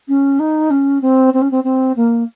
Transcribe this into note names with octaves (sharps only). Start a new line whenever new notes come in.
C#4
D#4
C#4
C4
C4
C#4
C4
C4
A#3